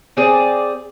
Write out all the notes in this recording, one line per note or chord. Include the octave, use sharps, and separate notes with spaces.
C4 G#4 D5